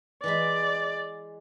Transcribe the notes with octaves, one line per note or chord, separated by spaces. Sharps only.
E3 G#3 D5 B5